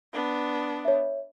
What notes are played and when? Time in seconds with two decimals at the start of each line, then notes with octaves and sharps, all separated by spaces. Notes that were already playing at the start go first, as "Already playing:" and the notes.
0.13 B3 D4
0.85 C#5 E5